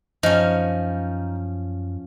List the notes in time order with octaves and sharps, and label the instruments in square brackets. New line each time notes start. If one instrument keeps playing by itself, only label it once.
[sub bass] F#2 [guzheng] F3 C#4 [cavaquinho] D#4